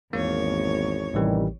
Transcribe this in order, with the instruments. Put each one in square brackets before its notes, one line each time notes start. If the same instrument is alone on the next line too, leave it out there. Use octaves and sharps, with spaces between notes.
[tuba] G#1 [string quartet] E2 C#5 [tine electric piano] A#3
[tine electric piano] A1 E3 [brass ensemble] C3 D#3 G3